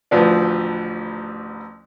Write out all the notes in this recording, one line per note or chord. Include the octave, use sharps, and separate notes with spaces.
A1 D2 F3 B4 D5